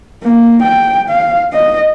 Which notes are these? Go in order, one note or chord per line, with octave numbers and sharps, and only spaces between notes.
A#3
G5
F5
D#5